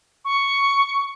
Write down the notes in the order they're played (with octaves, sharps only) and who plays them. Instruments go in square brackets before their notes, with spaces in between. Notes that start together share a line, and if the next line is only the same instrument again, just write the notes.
[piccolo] C#6